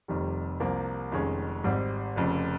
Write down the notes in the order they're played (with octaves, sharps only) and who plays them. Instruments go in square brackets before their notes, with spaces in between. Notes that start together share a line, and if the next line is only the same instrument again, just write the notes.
[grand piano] F1 F2 C3 D#3 G3
C2 C3 F3 A#3
F1 F2 D#3 G#3 C#4
G#1 G#2 G3 C4
F1 F2 C#3